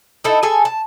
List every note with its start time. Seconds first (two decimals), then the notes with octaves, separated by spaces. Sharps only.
0.24 D#4 E4 A4
0.43 G#4 A4 G#5
0.65 A5